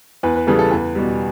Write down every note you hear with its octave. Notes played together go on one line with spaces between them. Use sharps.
E2 B4
B4
C#3 E3 G3 A4
A4
E2 B4
B2 G3